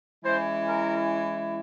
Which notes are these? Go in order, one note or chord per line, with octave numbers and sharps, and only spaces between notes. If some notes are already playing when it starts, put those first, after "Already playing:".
E3 G#3 C#4 E4 C5
A#4